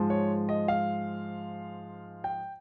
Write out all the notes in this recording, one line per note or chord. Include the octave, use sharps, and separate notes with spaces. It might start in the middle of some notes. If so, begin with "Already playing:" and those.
Already playing: G#2 F3 G#3
C#5
D#5
F5
G5